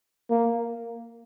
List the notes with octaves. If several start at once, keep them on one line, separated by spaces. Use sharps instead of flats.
A#3